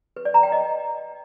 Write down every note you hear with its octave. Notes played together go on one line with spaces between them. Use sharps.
B4
D5
A#5
G5
D#5